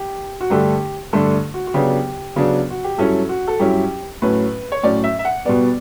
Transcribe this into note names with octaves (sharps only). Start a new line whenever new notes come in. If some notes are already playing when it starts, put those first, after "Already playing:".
Already playing: G4
F#4
G2 D3 A3 D4 G4
G2 D3 A3 D4 A4
F#4
F#4
C#3 F#3 B3 D4 G4
C#3 F#3 B3 D4
F#4
G4
G2 F#3 C#4 E4 A4
F#4
A4
G2 F#3 C#4 E4 G4
A2 F#3 C#4 B4
C#5
A2 F#3 C#4 D5
E5
E5
F#5
B2 G3 B3 D5